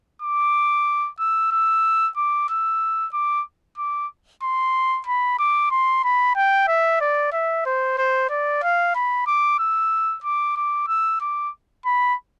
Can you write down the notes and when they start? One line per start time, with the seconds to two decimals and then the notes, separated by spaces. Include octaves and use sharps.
0.22 D6
1.19 E6
1.52 E6
2.17 D6
2.49 E6
3.14 D6
3.78 D6
4.43 C6
5.07 B5
5.39 D6
5.71 C6
6.04 B5
6.36 G5
6.68 E5
7.01 D5
7.33 E5
7.66 C5
7.98 C5
8.30 D5
8.63 F5
8.95 B5
9.27 D6
9.59 E6
10.24 D6
10.56 D6
10.88 E6
11.21 D6
11.86 B5